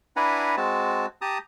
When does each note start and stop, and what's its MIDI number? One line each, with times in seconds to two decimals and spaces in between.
0.16 0.55 62
0.16 0.55 64
0.16 0.55 71
0.16 0.55 78
0.16 0.55 80
0.16 0.55 82
0.57 1.06 56
0.57 1.06 60
0.57 1.06 66
0.57 1.06 81
1.22 1.38 67
1.22 1.38 81
1.22 1.38 82
1.22 1.38 87